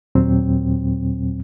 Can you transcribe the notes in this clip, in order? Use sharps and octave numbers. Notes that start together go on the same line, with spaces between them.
D#2 A#2 F#3 C4